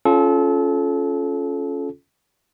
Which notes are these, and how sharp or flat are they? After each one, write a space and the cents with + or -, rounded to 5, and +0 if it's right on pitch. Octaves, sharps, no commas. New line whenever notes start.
C#4 +0 F4 +0 A4 -30